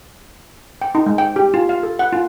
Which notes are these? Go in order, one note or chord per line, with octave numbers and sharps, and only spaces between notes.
G5
D#4
G#3
G5
G4
F4
F5
A4
F#5
F4